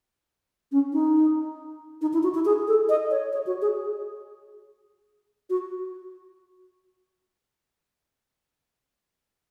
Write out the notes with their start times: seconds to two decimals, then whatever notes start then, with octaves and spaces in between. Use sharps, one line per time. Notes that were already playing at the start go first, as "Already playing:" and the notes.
0.72 C#4
0.93 D#4
2.02 D#4
2.13 E4
2.23 F#4
2.34 E4
2.45 G#4
2.68 A4
2.89 D#5
3.11 C#5
3.32 C#5
3.46 F#4
3.62 G#4
5.50 F#4